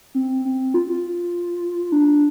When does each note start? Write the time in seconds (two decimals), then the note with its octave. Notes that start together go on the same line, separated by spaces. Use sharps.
0.15 C4
0.45 C4
0.74 F4
0.89 F4
1.92 D4